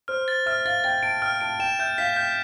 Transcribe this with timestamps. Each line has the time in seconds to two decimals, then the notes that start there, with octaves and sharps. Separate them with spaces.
0.08 C5 F6
0.28 A6
0.46 E5 F6
0.65 F5 A6
0.84 G5 A6
1.03 A5 D7
1.22 G5 F6
1.41 A5 D7
1.60 G5 E7
1.79 E5 G6
1.98 F5 B6
2.16 G5 G6